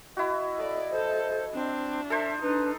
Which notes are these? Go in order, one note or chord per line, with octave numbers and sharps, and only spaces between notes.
E4 F#4 D#5
A4 D5
A4 C5
C4 D4
A4 C5 E5
D4 D#4 B4